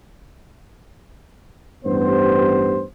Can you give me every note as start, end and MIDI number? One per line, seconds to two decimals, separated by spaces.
1.85 2.84 33
1.85 2.84 43
1.85 2.84 59
1.85 2.84 67
1.85 2.84 72